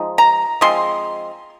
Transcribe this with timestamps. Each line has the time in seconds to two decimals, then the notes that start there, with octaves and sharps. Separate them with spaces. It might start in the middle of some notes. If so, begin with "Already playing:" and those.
Already playing: F3 G#3 D#4
0.18 A#5
0.61 F3 G#3 C4 C6